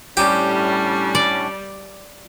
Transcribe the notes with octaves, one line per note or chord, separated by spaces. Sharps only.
A2 G3 C#4 D4 G4
D5